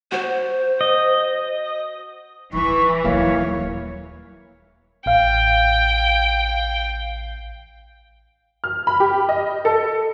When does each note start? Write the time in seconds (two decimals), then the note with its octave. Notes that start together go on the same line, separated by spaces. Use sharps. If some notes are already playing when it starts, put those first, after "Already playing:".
0.12 F#4 C5
0.81 D#5
2.53 D#1 D#3 E3 C#6
3.04 D#1 F#3 A#3 E4 C#5 F5
5.06 A1 F5 G5
8.64 F6
8.87 B5
9.00 G4
9.29 D#5
9.65 A4